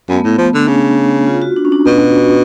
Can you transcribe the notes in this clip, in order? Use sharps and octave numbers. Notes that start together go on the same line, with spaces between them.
F#2 B3
A3
A2 B3
F3
D3
C#3 D4
F4
F#4
D4
C#4
D4
B2